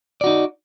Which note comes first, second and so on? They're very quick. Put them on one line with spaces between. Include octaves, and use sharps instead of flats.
D5 F#4 D#4